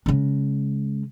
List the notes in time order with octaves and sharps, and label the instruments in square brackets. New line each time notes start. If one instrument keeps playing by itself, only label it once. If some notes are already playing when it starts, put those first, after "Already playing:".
[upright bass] C#3 G#3